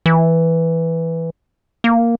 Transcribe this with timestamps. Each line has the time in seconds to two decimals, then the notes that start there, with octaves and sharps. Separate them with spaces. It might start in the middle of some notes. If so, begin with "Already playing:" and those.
0.06 E3
1.84 A#3